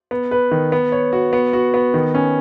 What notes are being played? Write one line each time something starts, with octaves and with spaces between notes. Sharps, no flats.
B3
B4
D#3
B3
C#5
F#4
B3
F#4
B3
D#3
C#4